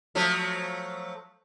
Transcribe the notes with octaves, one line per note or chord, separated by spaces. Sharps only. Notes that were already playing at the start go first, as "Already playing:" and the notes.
F3 F#3 A3